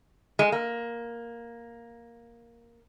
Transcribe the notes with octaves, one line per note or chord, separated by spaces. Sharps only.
G#3
A#3